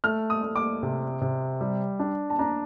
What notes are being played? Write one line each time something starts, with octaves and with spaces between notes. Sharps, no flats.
A3 F6
D#6
A3
D6
C3
C3
G3
D4
A5
D4 A#5